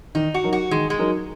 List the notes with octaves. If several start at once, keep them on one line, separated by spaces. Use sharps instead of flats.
D#3 D#4
F#4
F#3 D#4 A#4
F#4
D#3 G#3
G#3
F#3 D#4 A#4